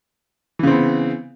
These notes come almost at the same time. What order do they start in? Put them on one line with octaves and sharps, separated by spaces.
E3 C#3 C4 B3